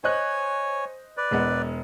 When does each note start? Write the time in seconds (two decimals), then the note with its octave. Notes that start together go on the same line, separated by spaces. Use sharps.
0.04 C5 C#5 D#5 G#5 F#6
1.17 B4 D5
1.31 E1 G#3 B3